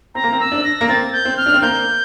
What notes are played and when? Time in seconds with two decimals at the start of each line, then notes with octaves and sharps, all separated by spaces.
0.15 C4 A#5
0.24 A#3
0.33 C4
0.40 E6
0.52 D4
0.64 A#6
0.81 A#3
0.89 C4 A6
1.13 G6
1.25 C4
1.37 F6
1.46 D4
1.54 C4
1.62 A#3 G6